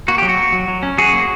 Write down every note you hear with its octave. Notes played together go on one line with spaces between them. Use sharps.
A#3 F#4
F#3 G4
F#4
A#3
F#3
F#3
C#4
F#3 F#4 G#4
A#3